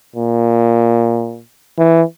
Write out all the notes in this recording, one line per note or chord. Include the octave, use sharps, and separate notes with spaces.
A#2
E3